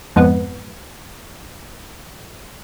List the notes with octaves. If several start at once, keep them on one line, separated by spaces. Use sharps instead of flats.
F2 G#2 B3